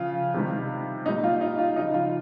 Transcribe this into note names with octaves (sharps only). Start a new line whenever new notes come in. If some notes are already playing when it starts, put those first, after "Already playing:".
Already playing: C#3 F3 F4
C3 D#3 G3
A#2 G3 D#4
F4
D#4
F4
C#3 F3 D#4
F4